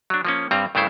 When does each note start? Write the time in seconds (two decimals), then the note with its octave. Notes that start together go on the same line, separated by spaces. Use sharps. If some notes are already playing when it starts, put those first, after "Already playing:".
0.10 F#3 D4
0.25 F3 A#3 C#4
0.51 G2 G3 C4 A#5
0.75 G2 C#3 A3 E4 C5